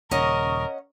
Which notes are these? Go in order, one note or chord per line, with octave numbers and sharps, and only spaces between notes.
D#1 C#3 C#4 A#4 D#5 F#5 C#6 D#6